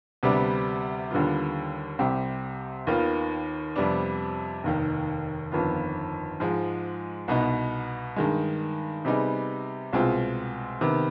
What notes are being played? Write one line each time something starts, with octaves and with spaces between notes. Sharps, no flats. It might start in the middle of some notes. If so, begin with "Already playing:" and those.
D2 C3 G3 B3 D4
D#2 D3 G3 B3 F4
C2 C3 G3 C4 G4
D#2 D#3 B3 F4
F2 C3 G3 B3 D4
F1 D#2 D#3
G1 F2 D#3 B3 F4
G#2 F3 G#3
C2 B2 B3 D#4
G2 D#3 G#3
C3 G3 B3 D#4 G#4
C2 B2 G#3 C4 F4
C3 D#3 B3